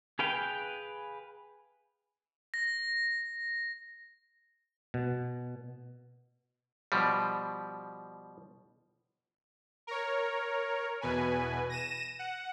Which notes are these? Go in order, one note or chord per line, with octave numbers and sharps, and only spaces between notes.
G#4 B4 F5 G5
A#6
B2
B2 F3 G3
A#4 C#5
E2 B2 B4 G#5
A#6 D#7 E7
F#5